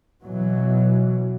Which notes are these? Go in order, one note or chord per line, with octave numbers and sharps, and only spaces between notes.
B2 E3 F#3